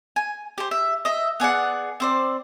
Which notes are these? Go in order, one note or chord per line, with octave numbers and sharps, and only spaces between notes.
G#5
G4 C5
E5
D#5 E5
B3 G#4 D5 F#5
C4 C5 D5